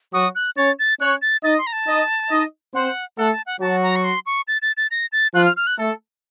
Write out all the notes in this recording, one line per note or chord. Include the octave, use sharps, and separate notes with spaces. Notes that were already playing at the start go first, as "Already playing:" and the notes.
F#3 F#4 D#6
F#6
C#4 C#5 A6
A6
C#4 C#5 F#6
A6
D#4 D#5 A6
C6
A#5
A5
D#4 D#5
D#4 D#5
C4 C5 F#5
A3 A4 F#5
A5
F#5
F#3 F#4 A5
A#5
C#6
C6
C#6
A6
A6
A6
A#6
A6
F3 F4 F#6
F6
F6
F#6
A3 A4